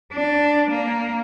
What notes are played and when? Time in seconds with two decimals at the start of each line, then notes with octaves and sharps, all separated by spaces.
0.13 D4
0.70 A#3